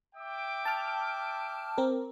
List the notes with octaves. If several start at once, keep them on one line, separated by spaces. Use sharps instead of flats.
E5 G5 D6
A5 F6
C4 A#4